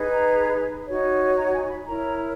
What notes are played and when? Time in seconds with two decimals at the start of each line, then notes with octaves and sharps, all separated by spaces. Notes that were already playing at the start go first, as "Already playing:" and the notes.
Already playing: D#4 G#4 B4
0.11 A#5
0.86 D#4 F#4 C#5
1.37 A#5
1.54 G#5
1.70 B5
1.87 E4 A#4 C#5 A#5